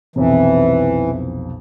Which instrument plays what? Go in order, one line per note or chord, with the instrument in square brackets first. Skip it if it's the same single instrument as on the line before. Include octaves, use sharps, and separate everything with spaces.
[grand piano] B1 F2 C3 [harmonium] E3